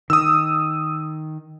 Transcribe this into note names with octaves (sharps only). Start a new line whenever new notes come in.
D#3 D#6 E6